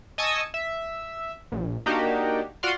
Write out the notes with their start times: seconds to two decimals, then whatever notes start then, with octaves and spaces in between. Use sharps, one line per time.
0.18 D#5 G#5 A5 C#6 D#6 E6
0.54 E5
1.52 A#1
1.86 A#3 D4 D#4 F#4 G4
2.63 F4 F#4 D5 F5 F#5 C6